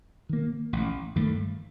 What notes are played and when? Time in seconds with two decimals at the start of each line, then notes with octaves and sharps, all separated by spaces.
0.29 D#3 A#3
0.73 A1
1.16 G2 D#3 A3